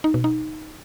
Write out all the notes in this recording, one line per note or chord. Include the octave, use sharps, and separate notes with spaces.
D#4
B2
D#4